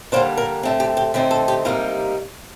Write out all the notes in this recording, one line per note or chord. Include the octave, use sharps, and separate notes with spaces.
D3 G3 A#3 D4 C5
A#4
D3 A3 C4
G4
G4
D3 A3 C4 D#4
A4
G4
C3 G3 A#3 D#4 F4